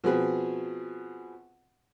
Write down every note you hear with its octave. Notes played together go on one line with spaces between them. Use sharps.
B2 F3 C4 G#4 B4